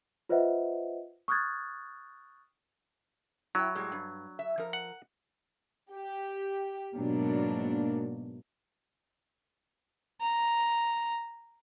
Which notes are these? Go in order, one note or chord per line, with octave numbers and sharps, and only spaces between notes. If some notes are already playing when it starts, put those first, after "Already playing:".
F4 B4 C5 D#5 E5 F#5
C#6 D#6 F6 F#6 G#6 A6
F#3 E4 G5
A2 G3 G#3
G2
E5
F3 A#4
F#5
G4
G#2 B2 F#3 A#3 D4
A#5